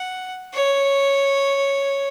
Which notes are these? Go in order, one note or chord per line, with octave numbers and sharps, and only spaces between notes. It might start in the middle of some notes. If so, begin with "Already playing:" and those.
Already playing: F#5
C#5